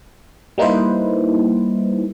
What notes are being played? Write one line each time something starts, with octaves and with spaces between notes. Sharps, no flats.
G3 A#3 D#4 E4 B4 C5